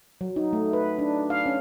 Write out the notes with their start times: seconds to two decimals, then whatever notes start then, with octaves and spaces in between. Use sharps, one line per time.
0.21 F#3
0.36 D#4
0.53 A3
0.73 B4
0.99 D4
1.30 F5
1.46 C#4